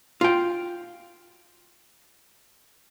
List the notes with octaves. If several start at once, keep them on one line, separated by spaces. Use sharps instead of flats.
F4 G5